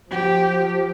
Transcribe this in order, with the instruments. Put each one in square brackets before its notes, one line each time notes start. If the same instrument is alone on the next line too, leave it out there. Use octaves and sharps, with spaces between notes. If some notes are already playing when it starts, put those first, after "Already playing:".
[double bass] F3 [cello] G4